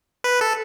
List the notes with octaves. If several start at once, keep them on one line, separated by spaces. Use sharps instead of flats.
B4
A4